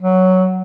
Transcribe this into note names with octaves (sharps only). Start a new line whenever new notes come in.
F#3